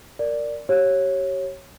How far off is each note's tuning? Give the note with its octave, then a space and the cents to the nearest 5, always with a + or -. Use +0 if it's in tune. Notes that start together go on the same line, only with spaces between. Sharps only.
A#4 -10 D5 +0
G4 -30 C#5 -20